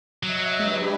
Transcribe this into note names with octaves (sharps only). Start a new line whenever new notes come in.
F#3 D#5 E5
G#3 D4 G4 B4